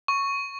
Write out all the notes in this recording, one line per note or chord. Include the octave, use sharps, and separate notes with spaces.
C#6